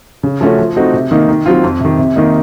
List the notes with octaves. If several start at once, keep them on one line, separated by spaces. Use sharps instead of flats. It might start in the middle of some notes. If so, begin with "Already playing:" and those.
C#3
F3 A3 C#4 F#4
F3
A3 C4 D#4 F#4
C3
D#3 A#3 D#4
D#3
F#3 C4 F4
F2
C3 D#3
C3
D#3 A#3 D#4